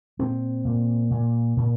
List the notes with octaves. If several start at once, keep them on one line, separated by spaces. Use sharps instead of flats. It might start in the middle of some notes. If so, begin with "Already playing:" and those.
A#2 C4
A#2
A#2
A#2